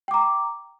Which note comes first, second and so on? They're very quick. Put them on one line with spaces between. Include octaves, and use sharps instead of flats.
G5 D6 A#5